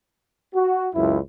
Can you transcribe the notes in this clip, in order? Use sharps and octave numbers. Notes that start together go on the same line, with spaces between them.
F#4
C#2 F#2 E4